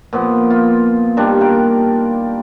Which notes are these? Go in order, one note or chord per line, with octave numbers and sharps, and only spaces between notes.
A#2 F3 B3
F4
D#3 G3 D4
A#3 A#4 G5